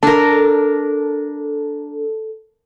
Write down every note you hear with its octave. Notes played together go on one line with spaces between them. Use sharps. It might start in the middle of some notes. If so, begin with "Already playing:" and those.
D4 A4 A#4